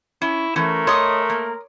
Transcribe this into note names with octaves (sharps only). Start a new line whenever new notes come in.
C#4 E4
E3 A3 C#4 A#4
C#5 D#5 C6 D#6
A#3